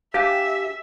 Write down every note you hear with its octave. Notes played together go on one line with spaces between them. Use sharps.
D4 G4 E5 F5 G#5